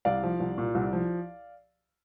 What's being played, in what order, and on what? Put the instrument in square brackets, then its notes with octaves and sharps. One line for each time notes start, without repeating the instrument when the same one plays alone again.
[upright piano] C2 D5 F5
F3
C2
A#2
C2
F3